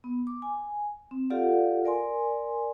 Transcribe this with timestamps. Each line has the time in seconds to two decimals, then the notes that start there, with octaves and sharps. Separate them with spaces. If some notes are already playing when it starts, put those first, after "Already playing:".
0.04 B3
0.27 D6
0.42 G#5
1.11 C4
1.30 F4 G4 A4 D5 F5 F#5
1.84 A#4 D5 G#5 C6